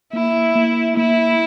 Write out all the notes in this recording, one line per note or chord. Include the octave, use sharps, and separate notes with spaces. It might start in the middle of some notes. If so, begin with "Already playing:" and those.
A#3 E4
A#3
A#3 E4